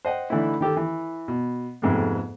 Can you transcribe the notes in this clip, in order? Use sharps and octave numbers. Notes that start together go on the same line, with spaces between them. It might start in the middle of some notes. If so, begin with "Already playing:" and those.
C5 D#5 F#5 G5
D3 E3 A3 D#4 E4
D#3 G4 A4
E3
B2
F2 G#2 C3 A3 B3